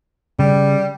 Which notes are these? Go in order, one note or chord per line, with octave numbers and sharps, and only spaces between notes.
C#3 G3